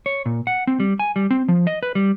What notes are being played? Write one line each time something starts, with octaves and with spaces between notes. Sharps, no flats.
C#5
A#2
F#5
C4
G3
G#5
G3
C4
F3
D#5
B4
G3